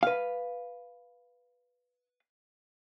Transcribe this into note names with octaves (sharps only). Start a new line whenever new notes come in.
B4 F5